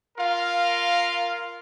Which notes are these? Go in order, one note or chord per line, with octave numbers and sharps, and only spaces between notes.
F4 A#4 F5